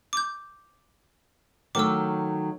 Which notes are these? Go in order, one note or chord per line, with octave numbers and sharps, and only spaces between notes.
D6 G6
D#3 F#3 A3 D6 E6